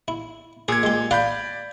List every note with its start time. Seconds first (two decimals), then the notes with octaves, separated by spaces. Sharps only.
0.08 E4
0.68 A#2 G#4 G#6
0.83 G#3 G4
1.11 F4 D5 F5 F#5 B5 G6